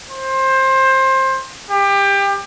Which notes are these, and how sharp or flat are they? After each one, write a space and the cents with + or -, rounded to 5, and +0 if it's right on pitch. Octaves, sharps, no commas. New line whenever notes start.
C5 +20
G4 +25